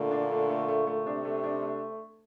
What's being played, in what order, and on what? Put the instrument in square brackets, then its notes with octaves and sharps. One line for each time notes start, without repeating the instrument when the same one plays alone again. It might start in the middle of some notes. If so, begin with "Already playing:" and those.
Already playing: [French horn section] A#2 D3 [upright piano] A3
[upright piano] D4
A3
A3
A3
A3
[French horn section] C3 [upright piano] D4
[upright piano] A3
D4
A3